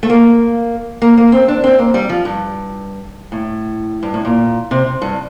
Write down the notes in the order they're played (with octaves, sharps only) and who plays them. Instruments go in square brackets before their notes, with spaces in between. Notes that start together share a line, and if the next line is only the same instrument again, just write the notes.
[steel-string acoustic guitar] A3
A#3
A#3
A#3
C4
D4
C4
A#3
G3
F3
G2
A2
G2
A2
A#2
C3
G2